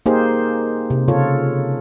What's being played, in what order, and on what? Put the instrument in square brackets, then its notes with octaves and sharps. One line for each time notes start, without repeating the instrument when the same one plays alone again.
[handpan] A#3 D#4 G4 G#4 A#4 C5
C3
C#3 F4 A4 C#5